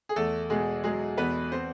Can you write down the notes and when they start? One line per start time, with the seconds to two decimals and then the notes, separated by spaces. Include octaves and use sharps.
0.09 G#4
0.16 E2 A3 A4
0.50 B2 G#3 G#4
0.84 F#3 G#3 G#4
1.17 E2 B3 B4
1.52 C4 C5